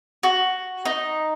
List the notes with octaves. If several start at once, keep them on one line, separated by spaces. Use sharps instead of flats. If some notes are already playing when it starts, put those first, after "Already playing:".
F#4
D#4